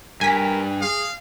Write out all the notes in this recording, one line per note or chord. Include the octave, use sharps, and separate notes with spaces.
G2 A#4 G#5 B6
G#4 F5